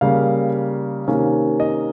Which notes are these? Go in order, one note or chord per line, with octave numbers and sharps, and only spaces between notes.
C#3 G3 A#3 F5
C3 D#3 A#3 C#4
D#5